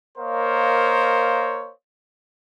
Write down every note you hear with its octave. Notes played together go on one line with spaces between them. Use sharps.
A#3 A#4 C5 C#5 D#5 F5